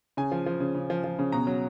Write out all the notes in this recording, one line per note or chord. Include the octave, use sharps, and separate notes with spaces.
C#3 G#5
F3
F3
C#3
C#3
F3
F3
C#3
B2 A#5
F#3